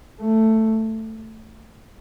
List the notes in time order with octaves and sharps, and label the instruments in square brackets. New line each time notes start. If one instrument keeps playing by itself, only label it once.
[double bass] A3